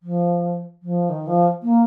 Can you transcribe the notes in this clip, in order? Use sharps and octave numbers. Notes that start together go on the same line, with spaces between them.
F3
F3
D#3
F3
A#3